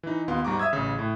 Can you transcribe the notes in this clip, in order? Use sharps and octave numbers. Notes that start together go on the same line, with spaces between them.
E3 D#4
D#2 B3 F4
G#2 G3 A#5 C#6 D6
E5 D#6 E6 G#6
A1 C#3
A2